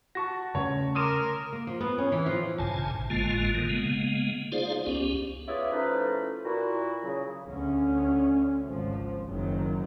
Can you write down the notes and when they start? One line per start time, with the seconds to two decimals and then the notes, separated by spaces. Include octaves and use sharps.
0.15 F#4 A5 C#6 A#6
0.55 C#3 A3 C#4 C#5
0.95 A#4 C6 D6 D#6 D#7 E7
1.53 A#3
1.67 F3
1.80 B3
1.98 C#4
2.12 E3
2.26 F3
2.58 A1 G2 A#2 C#3 G#5 A5
3.10 G#1 A2 D3 G#3 A#3 F4
3.55 B2 D3 D#3 A#3
3.69 C#3 G#3 A#3 B3
4.52 D#4 F4 G#4 C5 D5 F5
4.86 C#2 B3 C#4 G4
5.47 E4 F4 G#4 B4 C#5 D5
5.71 F3 A3 C#4 D#4 E4 B4
6.45 A#2 E4 F#4
7.02 C#3 F#3
7.47 D2 C#4
8.65 G#1 C#2 F3
9.26 F#1 D#3 F#3